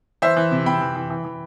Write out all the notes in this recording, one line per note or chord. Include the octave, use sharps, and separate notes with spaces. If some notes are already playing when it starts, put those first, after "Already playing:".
E3 C5 E5
E3
C3
C3 G5 B5
E3
E3
E3
E3